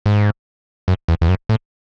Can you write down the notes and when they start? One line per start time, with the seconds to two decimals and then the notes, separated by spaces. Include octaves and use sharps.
0.06 G#2
0.88 F#2
1.08 E2
1.21 E2
1.29 F#2
1.49 A2